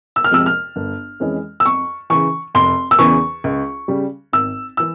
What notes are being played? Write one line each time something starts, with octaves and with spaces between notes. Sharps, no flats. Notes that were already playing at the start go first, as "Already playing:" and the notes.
E6
F6
F2 C3 F3 G#3 E6
F6
G1
F2 E3 G#3 C#4
E6
F2 C#6
C#3 E3 C#6
F1 C6
E6
E2 C#3 E3 C#6
C#2
C#3 G3
G#1 E6
E3 E6